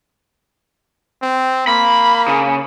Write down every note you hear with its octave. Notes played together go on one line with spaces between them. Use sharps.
C4
A#3 B5
C#3